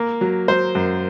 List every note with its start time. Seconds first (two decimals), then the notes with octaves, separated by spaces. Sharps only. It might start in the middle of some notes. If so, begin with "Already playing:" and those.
Already playing: A#3
0.21 F#3
0.48 F#3 C5
0.75 F#2